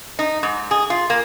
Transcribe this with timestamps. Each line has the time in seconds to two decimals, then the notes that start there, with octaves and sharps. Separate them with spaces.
0.19 D#4
0.43 G#2
0.71 G#4
0.90 F4
1.10 A#3